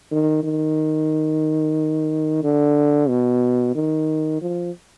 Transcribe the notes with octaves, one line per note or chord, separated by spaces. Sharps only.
D#3
D#3
D3
B2
D#3
F3